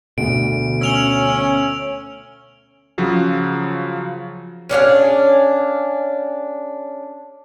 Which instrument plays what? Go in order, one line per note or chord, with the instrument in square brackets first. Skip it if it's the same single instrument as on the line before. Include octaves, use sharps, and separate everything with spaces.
[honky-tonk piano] D2 [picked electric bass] B2 [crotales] D7
[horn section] C#4 [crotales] E6 F7 G7
[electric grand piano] C#3 F3 F#3
[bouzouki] C#4 D4 G#4 F5